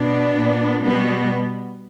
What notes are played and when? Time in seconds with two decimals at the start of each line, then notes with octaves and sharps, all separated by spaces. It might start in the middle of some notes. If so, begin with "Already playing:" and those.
Already playing: B2 B3 D4
0.38 A#2
0.83 B2 G3 B3